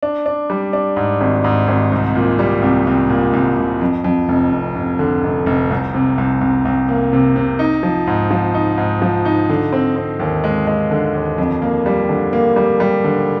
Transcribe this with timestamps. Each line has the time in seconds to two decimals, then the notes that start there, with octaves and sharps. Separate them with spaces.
0.03 D4
0.26 D4
0.50 G3
0.73 D4
0.96 G#2
1.21 G#1
1.44 G#2
1.68 G#1
1.92 C2
2.15 A#2
2.39 G3
2.62 C2
2.87 C2
3.10 A#2
3.33 C2
3.57 C2
3.81 F2
4.04 F2
4.28 F1
4.52 F1
4.76 F1
4.99 D3
5.23 F1
5.46 F1
5.70 C2
5.94 C3
6.18 C2
6.41 C2
6.65 C2
6.88 A#3
7.13 C3
7.36 C3
7.59 D#4
7.83 F3
8.07 G#2
8.31 F3
8.54 D#4
8.78 G#2
9.02 F3
9.25 D#4
9.49 D3
9.72 C4
9.96 C4
10.20 D#2
10.44 G#3
10.67 G#3
10.91 D3
11.15 D#2
11.38 F2
11.62 A#3
11.86 G3
12.09 D3
12.33 A#3
12.56 G3
12.80 G3
13.04 D3